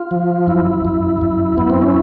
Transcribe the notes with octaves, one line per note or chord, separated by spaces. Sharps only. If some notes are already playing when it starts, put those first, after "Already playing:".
Already playing: F4
F3
F#2 E4
F#2
F#2
F#2 B3
C4
C#4